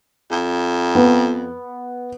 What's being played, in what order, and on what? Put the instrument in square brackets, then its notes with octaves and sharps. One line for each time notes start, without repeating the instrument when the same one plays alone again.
[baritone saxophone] F2
[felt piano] B3